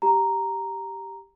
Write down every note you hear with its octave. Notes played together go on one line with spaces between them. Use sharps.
G4 A#5